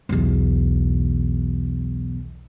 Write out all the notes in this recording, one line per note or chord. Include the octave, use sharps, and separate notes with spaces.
B1 E2